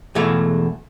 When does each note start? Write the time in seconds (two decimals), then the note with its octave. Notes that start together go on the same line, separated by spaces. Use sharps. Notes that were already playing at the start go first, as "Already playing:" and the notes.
0.15 E2 B2 A3 G#4 F5